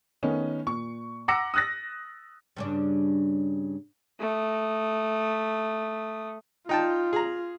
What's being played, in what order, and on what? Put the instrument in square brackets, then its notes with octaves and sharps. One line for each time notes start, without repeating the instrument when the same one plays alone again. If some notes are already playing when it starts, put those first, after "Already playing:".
[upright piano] D#3 A3 B3 C#4 D#4
A#2 C#6
F#5 A#5 D6 E6 A#6 C#7
D#6 E6 F#6 A6 A#6
[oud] G2 C#3 D4
[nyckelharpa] A3 D#6
[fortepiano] D#4 G5 A5 [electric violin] F4
[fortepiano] G#4 A#5